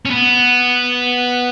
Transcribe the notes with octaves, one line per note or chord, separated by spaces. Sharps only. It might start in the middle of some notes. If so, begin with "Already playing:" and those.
C#4
B3